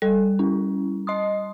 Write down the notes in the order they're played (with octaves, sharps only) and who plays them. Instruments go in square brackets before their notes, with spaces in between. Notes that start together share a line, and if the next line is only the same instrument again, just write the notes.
[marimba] G3 [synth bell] A4
[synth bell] C#4 E4
D#5 C6 D#6